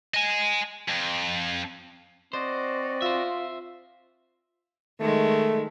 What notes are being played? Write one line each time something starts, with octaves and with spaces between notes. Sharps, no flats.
D#5 G#5
F2
C4 F#4 C5 D5 D#5
F4 C5 E5
D#3 G#3 A3